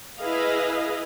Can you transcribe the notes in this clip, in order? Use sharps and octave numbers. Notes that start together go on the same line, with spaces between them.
E4 G#4 B4 D#5 F5